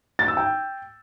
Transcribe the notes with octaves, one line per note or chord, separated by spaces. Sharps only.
A6
E6
G5